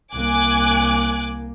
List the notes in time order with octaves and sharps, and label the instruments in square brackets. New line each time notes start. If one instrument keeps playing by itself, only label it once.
[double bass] C2 A#3 [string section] G#5 D6 F#6